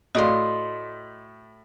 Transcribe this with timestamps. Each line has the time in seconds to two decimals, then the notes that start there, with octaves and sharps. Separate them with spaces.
0.15 A2 A3 F#4 D5 D#5 F5 C6